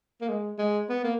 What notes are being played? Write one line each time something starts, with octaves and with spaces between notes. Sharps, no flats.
A#3
G#3
G#3
B3
A#3